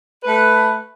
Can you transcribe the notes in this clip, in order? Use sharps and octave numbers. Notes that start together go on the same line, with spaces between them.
A3 A4 B4